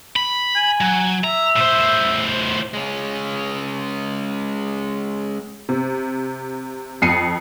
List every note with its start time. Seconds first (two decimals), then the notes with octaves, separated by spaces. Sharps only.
0.16 B5
0.56 G#5
0.81 F#3
1.24 E5 A#5
1.57 A2 C5
2.74 G#3 C#4
5.69 C3
7.02 F2 C7 C#7 D#7